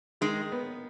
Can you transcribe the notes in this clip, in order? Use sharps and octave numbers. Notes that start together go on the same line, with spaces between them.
D#3 G#3
B3